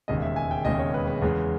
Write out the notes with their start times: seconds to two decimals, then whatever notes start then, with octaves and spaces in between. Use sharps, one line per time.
0.08 E1 D#2 C#3 G#3 D#5
0.22 E5
0.36 G#5
0.51 G5
0.65 E1 D#2 C#3 G#3 D#5
0.79 C#5
0.94 B4
1.07 B4
1.22 E2 C#3 G#3 B4